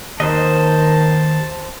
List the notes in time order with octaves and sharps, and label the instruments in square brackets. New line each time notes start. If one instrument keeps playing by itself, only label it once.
[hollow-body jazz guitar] D#2 [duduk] D#3 [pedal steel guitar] C5 D#5 [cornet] A5